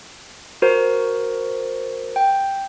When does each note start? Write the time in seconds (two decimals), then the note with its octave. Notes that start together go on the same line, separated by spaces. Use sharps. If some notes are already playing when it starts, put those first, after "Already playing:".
0.62 F#4 A#4 C5
2.16 G5